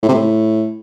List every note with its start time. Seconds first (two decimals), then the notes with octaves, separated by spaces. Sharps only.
0.03 A2
0.09 C3
0.15 A2